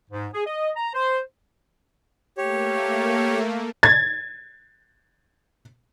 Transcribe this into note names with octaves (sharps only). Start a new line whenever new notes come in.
G#2
G#4
D#5
A#5
C5
A3 A#3 G4 C#5
G#6 A6